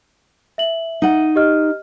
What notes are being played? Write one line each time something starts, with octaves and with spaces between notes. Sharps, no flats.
E5 F#7
D#4 F#5
G4 D#5 F6